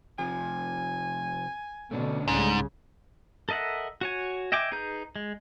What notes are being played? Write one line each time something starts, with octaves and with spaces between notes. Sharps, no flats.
C3 F3 G#5
B2 D3 A3 C#4 D4
C2 G#2 C#3
A4 A#4 D#5 E5 F#5
F#4 C#5 G#5
D#5 E5 G5 G#5 D6
D#4 G#4 B4 A#5 G6
G#3